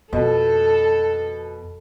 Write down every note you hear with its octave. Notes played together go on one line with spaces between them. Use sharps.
F2 B2 A4